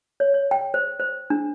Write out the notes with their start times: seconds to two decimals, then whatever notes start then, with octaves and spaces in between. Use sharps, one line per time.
0.20 C#5
0.34 C#5
0.51 G5
0.74 C5
1.00 C5
1.30 D4